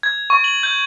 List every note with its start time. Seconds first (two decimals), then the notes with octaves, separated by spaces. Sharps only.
0.03 G#6
0.30 C#6
0.44 F#7
0.63 G6